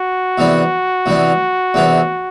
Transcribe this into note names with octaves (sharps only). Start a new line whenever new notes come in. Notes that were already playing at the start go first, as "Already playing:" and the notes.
Already playing: F#4
E2 C3 E3 B3 D4
E2 C3 E3 B3 D4
E2 C3 E3 B3 D4